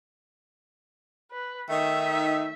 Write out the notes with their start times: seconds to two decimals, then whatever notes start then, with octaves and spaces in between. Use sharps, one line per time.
1.31 B4
1.70 D#3 A3 D#4 E5